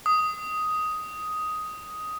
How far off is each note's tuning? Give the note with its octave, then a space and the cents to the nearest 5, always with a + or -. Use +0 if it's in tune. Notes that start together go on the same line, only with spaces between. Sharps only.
D#6 +5